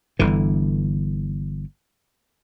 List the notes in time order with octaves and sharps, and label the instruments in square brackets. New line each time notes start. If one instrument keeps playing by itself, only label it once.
[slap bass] G1 D3 E3